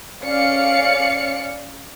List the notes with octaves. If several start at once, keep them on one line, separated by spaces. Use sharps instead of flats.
C#4 D5 F5 C#7